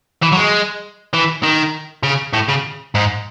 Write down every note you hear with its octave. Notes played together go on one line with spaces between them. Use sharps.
E3
F#3
G#3
E3
D#3
C#3
A2
C#3
G#2